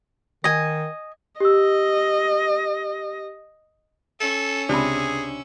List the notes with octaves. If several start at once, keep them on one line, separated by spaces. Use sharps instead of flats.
D#3 D#5 G#5
G4 D#5 E6
C#4 A4 E6
C#2 C3 D4 G#4 B5